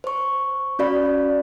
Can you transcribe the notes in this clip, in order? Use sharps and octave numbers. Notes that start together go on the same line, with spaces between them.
C5 C#6
C#4 F#4 D5 F5 B5